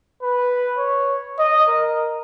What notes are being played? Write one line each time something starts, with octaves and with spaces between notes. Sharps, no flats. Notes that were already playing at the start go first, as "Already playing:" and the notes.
B4
C#5
D#5
A#4